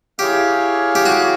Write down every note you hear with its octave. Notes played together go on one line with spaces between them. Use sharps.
E4 G4 G#4 C#5 F5
G4
F#4